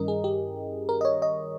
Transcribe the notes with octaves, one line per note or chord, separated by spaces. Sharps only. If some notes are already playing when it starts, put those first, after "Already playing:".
Already playing: G2 D#3 G3 C#4 E4 A#4 D#5
G#4
G4
A#4
D#5
C#5
D#5